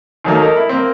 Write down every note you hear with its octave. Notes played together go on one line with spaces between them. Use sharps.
D#2 D#3 F#3 A3 A#3
A4 A#4 D#5
E4
A#3 C4